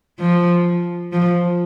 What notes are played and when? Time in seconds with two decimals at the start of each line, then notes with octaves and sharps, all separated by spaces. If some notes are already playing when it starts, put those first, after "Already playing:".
0.20 F3
1.13 F3